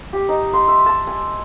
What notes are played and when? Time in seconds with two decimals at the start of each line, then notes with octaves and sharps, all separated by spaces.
0.13 G4
0.29 D#4
0.53 C6
0.68 E5
0.86 A5
1.07 G#5